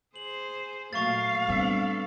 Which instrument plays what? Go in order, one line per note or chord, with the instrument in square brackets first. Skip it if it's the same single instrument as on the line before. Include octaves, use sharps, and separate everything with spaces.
[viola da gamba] G#4 C5 [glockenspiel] F#7
[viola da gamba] A#2 F#3 A3 [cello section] F5 [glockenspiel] C#6 A6
[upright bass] G3 C4 [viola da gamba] B3 D4 A4